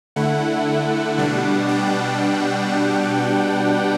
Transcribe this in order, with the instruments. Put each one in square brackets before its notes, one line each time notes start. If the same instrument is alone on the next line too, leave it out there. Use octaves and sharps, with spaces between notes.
[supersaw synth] D3 A3 E4 F#5
B2 G3 D4 F#5
G5